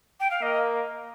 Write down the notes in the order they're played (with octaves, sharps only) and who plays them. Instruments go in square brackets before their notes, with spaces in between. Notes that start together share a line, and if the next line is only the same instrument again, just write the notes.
[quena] G5
F5
[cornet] A#3 [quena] D#5